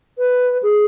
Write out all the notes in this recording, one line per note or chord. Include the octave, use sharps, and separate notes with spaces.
B4
G#4